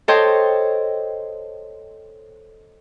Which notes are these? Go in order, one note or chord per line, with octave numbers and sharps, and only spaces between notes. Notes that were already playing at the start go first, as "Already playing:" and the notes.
A4 C5 C#5 D#5 G5